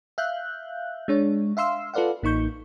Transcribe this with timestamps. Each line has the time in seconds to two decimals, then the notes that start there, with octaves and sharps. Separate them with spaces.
0.18 E5 F5 F#6 G6
1.08 G#3 D4 C#5
1.57 E5 F5 C6 E6
1.94 F4 A4 B4 D5 F5 F#5
2.22 A1 A#3 D#4 C#6 G6